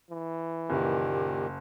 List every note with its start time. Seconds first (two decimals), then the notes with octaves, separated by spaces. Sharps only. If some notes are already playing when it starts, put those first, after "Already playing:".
0.10 E3
0.70 F#1 A#2 D#3 G4